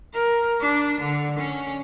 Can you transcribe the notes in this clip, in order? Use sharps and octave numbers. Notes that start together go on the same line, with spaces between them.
A#4
D4
D3
C#4